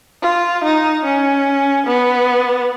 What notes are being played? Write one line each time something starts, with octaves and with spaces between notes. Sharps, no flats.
F4
D#4
C#4
B3